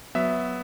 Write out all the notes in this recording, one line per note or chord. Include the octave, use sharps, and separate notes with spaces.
F#3 B3 E5